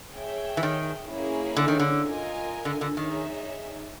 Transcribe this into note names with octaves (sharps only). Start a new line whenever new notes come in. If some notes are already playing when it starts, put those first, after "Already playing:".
G#4 C#5 E5 G5
E3
D#3
A#3 C#4 E4 G#4 C#5
D3
D#3
D3
F4 A#4 D#5 G#5
D3
D3
D#3 D#4 G#4 C#5 E5